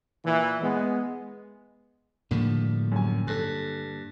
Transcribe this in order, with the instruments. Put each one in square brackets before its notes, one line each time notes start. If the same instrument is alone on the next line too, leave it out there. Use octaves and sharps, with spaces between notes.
[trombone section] A#2 E3
G#3 B3
[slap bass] A2 F3 G3 [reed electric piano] D3 A#3
[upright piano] F#2 G#5
[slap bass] G2 [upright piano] A4 F#6